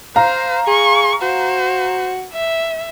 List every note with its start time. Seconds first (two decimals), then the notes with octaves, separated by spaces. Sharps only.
0.16 C5 F5 A#5
0.67 G#4 C#6
1.22 F#4 C5
2.33 E5